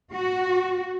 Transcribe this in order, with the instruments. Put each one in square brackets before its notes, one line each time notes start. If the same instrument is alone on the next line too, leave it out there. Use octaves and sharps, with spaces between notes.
[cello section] F#4